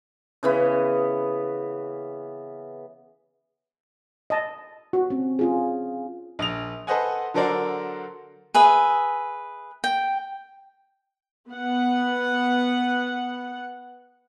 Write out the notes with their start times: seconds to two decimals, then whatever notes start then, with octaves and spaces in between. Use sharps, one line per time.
0.43 C#3 E3 B3
4.30 D#5 A5
4.93 F#4
5.10 C4 C#4
5.39 C#4 F4 G#4
6.39 A#1 D#6 F7
6.87 A4 B4 C5 D#5 F#5 G#5
7.34 D3 F#3 A4 A#4 C5 D5
8.54 G#4 B4 E5
9.84 G5
11.51 B3 F#5